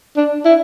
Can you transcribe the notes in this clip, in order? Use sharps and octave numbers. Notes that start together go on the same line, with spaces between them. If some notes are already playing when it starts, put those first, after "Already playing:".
D4
E4